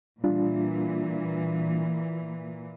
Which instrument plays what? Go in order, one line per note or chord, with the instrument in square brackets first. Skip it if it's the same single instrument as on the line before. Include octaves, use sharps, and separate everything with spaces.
[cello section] A#2 E3 [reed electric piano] G3 D4 F4